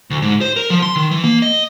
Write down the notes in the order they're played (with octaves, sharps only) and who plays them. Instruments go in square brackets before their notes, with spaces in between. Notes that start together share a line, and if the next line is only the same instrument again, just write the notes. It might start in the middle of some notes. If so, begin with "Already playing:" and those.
[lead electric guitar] D2
G#2
C5
A#4
F3
C6
D#3
E3
A#3
D#5